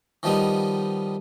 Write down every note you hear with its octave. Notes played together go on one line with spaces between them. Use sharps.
D#3 F3 G3 B3 D#4